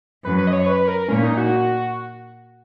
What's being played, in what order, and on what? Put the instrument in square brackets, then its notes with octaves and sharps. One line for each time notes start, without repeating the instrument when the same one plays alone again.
[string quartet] F#2 [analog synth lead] B4
[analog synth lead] B4
D#5
C#5
B4
A#4
[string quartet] A#2 [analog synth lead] C#4
[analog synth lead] D#4
F#4